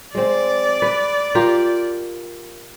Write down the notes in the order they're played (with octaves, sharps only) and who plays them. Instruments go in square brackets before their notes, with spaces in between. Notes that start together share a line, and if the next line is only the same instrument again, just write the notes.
[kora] G#3 C4 [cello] D5
[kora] B4
F4 G4 A#4